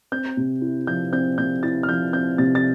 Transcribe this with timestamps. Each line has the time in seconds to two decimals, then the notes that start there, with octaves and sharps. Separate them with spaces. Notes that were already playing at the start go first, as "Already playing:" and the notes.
0.12 C4 G6
0.37 C3
0.62 E4
0.87 F3 G6
1.12 C4 G6
1.38 C3 G6
1.63 E4 A6
1.83 F6
1.88 F3 G6
2.13 C4 G6
2.38 C3 A6
2.55 A6